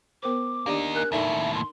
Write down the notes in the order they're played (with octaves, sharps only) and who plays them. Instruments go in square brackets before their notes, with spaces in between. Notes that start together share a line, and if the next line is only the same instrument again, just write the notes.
[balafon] B3 A#4 C5 [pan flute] D6
[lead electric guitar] A#3 D#4 [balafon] D4 G4 D5
[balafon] A#4 G#5 [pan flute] F#6
[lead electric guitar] D#2 A2 [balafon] D#4 A4 D5 [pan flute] E5
[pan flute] C6